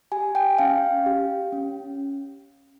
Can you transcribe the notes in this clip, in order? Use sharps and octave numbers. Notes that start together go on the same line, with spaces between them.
G4 G#5
G5
C#4 F5
G4
C#4